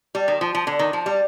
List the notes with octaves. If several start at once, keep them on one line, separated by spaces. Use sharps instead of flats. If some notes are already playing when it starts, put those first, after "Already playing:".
G3
D#3
F3
F3
D3
D#3
F3
G3